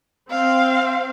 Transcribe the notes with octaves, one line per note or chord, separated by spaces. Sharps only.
C4 F5